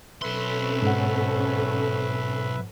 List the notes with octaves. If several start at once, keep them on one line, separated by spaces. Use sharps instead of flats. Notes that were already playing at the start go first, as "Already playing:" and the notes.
B1 C4 C#4 A4 B4 E5 C6
G#2 F#5